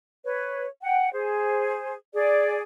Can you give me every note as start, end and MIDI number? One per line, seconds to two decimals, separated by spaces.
0.24 0.66 71
0.24 0.66 73
0.82 1.11 78
0.82 1.11 79
1.12 1.93 68
1.12 1.93 72
2.13 2.61 68
2.13 2.61 74